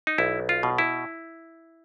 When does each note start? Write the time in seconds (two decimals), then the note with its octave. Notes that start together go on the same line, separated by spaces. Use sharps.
0.07 D#4
0.18 B1 E4
0.49 F4
0.63 B2
0.78 E4